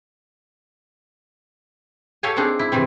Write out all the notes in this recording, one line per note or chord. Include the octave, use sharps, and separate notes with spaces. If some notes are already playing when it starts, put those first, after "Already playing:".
G4 A4 C#5 F5 G#5 A5
A#3 C4 D4 D#4 G#4
E4
C3 D#3 E3 C4